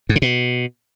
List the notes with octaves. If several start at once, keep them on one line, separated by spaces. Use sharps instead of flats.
G#2
C#3
B2